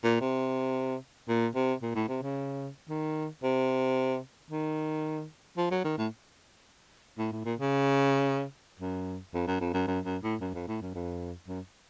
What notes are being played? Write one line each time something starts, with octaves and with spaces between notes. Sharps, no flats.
A#2
C3
A#2
C3
A#2
A2
C3
C#3
D#3
C3
D#3
F3
F#3
D#3
A2
A2
A2
A#2
C#3
F#2
F2
F#2
F2
F#2
F#2
F#2
A2
F#2
F2
A2
F#2
F2
F#2